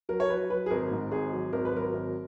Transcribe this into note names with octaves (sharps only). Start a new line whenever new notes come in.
F#3 A#4
C#5
F#3 B4
F#3 B4
G#4
G#1 A#4
G#2
G#1 G#4
F#3
G#1 A#4
B4
F#3 A#4
G#1